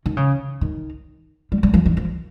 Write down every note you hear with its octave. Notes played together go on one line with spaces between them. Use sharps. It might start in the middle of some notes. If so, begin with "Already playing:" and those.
D#3
C#3
D#3
G3
G3
F3
D#3
F3